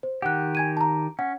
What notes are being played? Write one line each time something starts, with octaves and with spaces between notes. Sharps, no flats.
C5
D#3 G4 F#5 F#6
G#5 G#6 D#7
A5 A#5
C#4 F#5